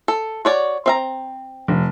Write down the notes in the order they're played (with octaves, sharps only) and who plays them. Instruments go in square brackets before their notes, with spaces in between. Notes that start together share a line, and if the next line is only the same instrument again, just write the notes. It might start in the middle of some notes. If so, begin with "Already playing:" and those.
[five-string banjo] A4
F#4 C#5 D5
C4 E5 A#5
[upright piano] F1